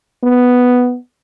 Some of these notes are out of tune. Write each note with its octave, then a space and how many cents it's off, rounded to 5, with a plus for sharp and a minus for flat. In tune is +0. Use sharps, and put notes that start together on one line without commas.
B3 +0